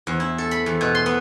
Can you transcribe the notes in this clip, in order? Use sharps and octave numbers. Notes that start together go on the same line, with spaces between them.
E2
E4
A4
B5
E2
B2
C6
B3